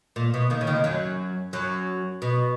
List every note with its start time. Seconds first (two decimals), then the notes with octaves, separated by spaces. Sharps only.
0.16 A#2
0.34 B2
0.50 D#2 D#3
0.61 C#3
0.67 D#2 D#3
0.84 F#2 F#3
1.53 F#2 F#3
2.22 B2